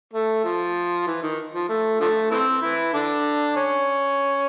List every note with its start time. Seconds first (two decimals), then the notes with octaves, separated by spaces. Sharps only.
0.13 A3
0.44 F3
1.07 E3
1.22 D#3
1.54 F3
1.69 A3
2.00 D3 F3 A3
2.31 E3 A3 C4
2.62 E3 E4
2.93 D3 D4
3.56 C#4